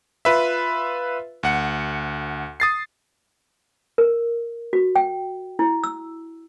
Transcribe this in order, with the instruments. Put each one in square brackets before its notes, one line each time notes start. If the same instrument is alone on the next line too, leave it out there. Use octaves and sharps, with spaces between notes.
[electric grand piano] F4 B4 E5
D2 F#5 C#7
D#6 A6 C7
[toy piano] A#4
F#4
G5
E4
E6